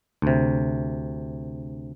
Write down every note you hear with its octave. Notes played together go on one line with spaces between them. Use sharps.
D2 C3